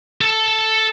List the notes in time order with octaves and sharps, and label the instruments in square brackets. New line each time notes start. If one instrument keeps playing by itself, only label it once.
[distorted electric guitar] A4 A5